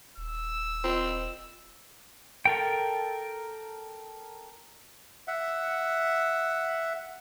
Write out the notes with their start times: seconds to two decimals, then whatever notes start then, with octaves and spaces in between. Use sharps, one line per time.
0.17 D#1 E6
0.84 C4 F4 D#5
2.45 A4 A#4 G5
5.27 E5 F#5